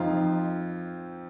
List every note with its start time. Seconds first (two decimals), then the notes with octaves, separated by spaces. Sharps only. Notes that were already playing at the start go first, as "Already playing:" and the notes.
Already playing: F2 F3 C4 D#4 F4